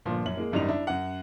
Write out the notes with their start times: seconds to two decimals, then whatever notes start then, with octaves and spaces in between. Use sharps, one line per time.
0.05 G1 A#2 F3
0.25 F#2 C#4 F#7
0.37 G#3 A#3
0.52 G#1 F#2 G3 D#4 F7
0.69 D4 E4
0.87 F#2 F#5